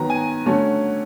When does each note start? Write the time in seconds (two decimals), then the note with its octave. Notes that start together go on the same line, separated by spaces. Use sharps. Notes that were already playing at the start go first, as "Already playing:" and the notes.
Already playing: D#3 F#3 B3 A#5
0.10 G#5
0.46 D3 F#3 A3 C#4